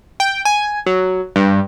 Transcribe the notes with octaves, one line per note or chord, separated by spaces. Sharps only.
G5
G#5
F#3
G2